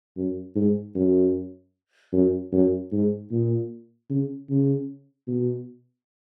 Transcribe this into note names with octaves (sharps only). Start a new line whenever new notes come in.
F#2
G#2
F#2
F#2
F#2
G#2
A#2
C#3
C#3
B2